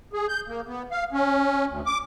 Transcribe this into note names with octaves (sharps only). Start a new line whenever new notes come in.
G#4
G6
A#3
B3
F5
C#4
D2
D6